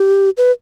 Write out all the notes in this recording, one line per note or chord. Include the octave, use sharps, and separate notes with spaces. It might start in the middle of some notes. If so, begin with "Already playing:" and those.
Already playing: G4
B4